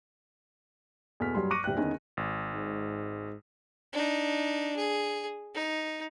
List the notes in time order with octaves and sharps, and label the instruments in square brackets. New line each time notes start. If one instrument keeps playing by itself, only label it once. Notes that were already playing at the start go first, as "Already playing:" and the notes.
[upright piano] E2 B2 A4 F6 B6
G2 F#3 G3 C6
C#6 D6 F#6 A#6 C#7 D#7
D#1 G3 E4 G5 F#6
E2 D3 D#3 C#4 D#4
[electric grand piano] G#1
[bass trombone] G#2
[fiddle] D4 D#4
G#4
D#4